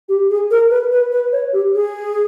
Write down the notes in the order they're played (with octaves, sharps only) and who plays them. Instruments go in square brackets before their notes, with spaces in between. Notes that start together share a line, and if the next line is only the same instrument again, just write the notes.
[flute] G4
G#4
A#4
B4
B4
B4
C#5
G4
G#4